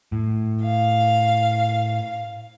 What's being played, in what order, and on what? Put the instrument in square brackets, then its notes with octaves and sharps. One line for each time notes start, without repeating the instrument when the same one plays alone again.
[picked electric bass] A2
[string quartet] F5